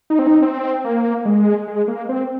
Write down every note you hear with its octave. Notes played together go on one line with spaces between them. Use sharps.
D#4
C4
D#4
C4
A#3
G#3
G#3
A#3
C4